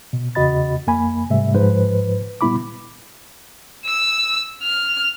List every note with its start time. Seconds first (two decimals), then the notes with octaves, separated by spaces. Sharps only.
0.13 B2
0.35 E2 C#3 F#4 D#5 B5 A6
0.87 F2 A#3 G#5 B5
1.30 G#2 C3 G3 A3 E5
1.54 G#2 F3 B4 C5
2.41 A#2 G3 B3 E4 B5 D6
3.86 E6
4.63 F6